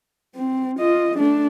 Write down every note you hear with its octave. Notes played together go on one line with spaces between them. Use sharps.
C4
F4 D#5
A3 D4